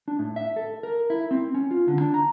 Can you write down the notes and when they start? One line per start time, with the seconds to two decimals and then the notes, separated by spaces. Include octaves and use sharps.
0.08 D4
0.19 A2
0.36 E5
0.56 A4
0.83 A#4
1.10 E4
1.31 C4
1.54 C#4
1.71 F4
1.88 D3
2.01 D4
2.14 A#5